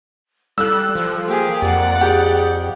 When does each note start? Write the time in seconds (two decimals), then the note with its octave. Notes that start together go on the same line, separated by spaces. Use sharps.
0.58 G3 A4 E6 F#6
0.95 F3
1.27 A#3 G4 G#4
1.62 F2 D5 F#5
2.01 G4 G#4